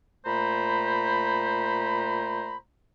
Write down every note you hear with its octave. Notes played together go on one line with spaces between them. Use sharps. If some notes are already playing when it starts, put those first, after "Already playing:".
A#2 A3 C5 A#5 B5